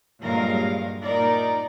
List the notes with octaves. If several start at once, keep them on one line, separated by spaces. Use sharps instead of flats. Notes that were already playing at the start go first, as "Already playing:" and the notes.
G2 A#2 F#3 G#3 A#4 F5
A#2 D#4 A#4 D5